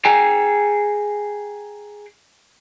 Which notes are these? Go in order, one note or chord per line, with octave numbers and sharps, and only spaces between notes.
G#4 G5 G#5 A#5